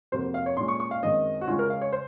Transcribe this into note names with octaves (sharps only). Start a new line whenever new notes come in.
F2 C3 F#3 A#3 C5
F5
C#5
A#2 G#3 C#4 C6
C#6
C#6
F5
F#2 D#3 G#3 C4 D#5
F#4
C#3 G#3 C#4 F4
A#4
F5
C#5
C5